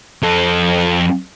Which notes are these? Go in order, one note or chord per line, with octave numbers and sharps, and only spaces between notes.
F2 A4